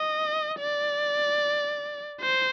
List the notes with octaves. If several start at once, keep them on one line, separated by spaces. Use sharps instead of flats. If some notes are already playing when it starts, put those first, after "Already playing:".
Already playing: D#5
D5
C5